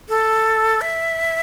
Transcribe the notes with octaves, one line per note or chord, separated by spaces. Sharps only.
A4
E5